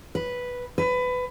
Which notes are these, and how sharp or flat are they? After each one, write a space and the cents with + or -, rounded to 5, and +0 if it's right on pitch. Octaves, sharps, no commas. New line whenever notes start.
B4 -5
B4 +20